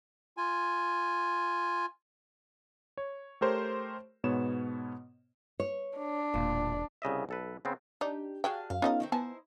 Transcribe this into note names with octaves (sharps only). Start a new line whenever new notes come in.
F4 G#5
C#5
A3 G4 A#4 C5 C#5
G#2 B2 B3 C#5 E7
C#5
D4
E1 A#2
C2 C#3 D#5 E5
B1 A4 B4
C#3 B3 C4
D4 D#4 G4
D4 F#4 G#4 D#5 F5 G5
F#2 F5
B3 C#4 D#4 F4 A4 D#5
D#3 A3 C4
B3 D#4 E4 C5 G#5 A5